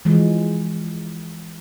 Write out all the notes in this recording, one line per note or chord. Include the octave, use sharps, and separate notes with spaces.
E3 F3 G#3